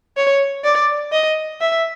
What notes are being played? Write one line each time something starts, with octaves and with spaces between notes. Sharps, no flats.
C#5
D5
D#5
E5